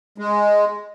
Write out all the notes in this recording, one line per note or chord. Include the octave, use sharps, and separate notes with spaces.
G#3